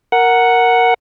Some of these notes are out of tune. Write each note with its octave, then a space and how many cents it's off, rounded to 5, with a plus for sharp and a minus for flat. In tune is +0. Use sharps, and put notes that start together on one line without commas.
A#4 +0 F#5 +0